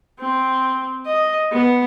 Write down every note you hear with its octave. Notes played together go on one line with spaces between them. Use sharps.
C4
D#5
B3